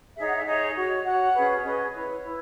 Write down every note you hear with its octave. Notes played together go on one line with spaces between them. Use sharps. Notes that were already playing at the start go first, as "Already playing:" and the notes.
D#4 G#4 C#5 E5
F#5
E5
D#4 G#4 C#5 D#5
F#4 C#5
F#4 C#5 F#5
C#4 G#4 B4
C#5
C#4 G#4 B4 D#5
E4 B4 C#5
E4 B4